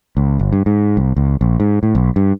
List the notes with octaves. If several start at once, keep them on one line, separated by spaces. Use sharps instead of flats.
C#2
G1
G2
G#2
C2
C#2
A#1
G#2
A2
B1
G2